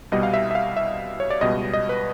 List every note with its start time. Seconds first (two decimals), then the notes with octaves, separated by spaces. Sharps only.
0.12 C2 B2 G3 D#5
0.23 F5
0.34 E5
0.51 E5
0.55 F5
0.77 E5
1.20 C#5
1.30 D5
1.41 C#2 B2 G3 D#5
1.73 D#5
1.89 B4